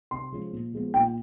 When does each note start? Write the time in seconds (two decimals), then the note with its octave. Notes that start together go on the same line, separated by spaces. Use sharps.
0.11 C3 C6
0.32 F3 G#3 C#4
0.52 A#2
0.73 F3 G#3 B3
0.94 A#2 G5